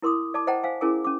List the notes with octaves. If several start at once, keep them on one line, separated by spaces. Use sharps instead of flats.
E4 A#4 C6 D6 D#6
D5 A5 D6
C5 D#5 F#5 G5 A5 A#5
C5 F5 G#5
C#4 E4 G#4 A#4 G#5 D6
C#4 D6